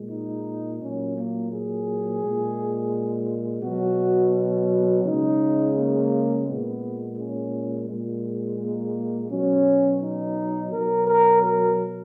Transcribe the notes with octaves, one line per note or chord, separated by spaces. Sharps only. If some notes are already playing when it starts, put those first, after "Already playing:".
Already playing: A#2 G#3
D#4
A#2 F#3 C#4
A#3
G#4
A#2 G#3
B2 F#3 F#4
C#3 G#3 D#4
A#3
A#2 G#3 B3
C#4
A#2 G#3
A#3
B2 F#3 C#4
D#4
B2 F#3 A#4
A#4
A#4